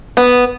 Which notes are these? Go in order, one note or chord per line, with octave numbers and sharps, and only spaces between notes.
B3